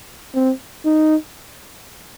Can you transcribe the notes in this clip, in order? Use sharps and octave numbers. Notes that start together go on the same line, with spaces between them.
C4
D#4